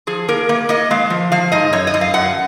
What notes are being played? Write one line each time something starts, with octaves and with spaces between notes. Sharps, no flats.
F3 G#4
A#3 A#4
A#3
A#3 D#5
G#3 F5
F3
F3 F5
G#2 D#5
F#2 C#5
D#5
F#2
F5
F#2 F#5